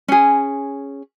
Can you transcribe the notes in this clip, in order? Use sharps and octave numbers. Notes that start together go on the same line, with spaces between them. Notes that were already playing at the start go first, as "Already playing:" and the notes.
C#4 G#4